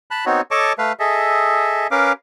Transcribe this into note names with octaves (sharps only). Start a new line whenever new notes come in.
A5 B5 F#6
B3 C4 D#4 F#4 C#5
A4 C#5 D#5 A5 C#6 D6
A3 B4 F5
G#4 A4 D#5 E5
C#4 A#4 B4 F5 D6